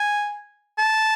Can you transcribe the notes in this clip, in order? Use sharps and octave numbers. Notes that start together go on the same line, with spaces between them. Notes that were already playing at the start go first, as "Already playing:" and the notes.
Already playing: G#5
A5